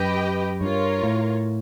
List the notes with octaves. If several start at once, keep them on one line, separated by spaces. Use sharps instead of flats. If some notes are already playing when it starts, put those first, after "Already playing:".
Already playing: F#2 G4 B4 D#5 G5
G2 F4 A#4 C#5
A2